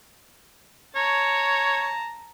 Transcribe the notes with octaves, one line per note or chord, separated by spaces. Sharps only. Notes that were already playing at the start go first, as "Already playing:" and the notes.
C#5 A5 A#5